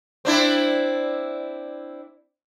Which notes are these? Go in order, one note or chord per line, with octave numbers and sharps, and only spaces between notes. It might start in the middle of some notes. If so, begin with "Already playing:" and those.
C4 D4 E4